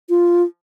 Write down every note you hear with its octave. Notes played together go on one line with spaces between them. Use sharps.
F4